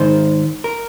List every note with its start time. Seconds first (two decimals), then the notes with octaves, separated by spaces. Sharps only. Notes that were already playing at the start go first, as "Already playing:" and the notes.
Already playing: G#2 D#3 C5
0.64 A#4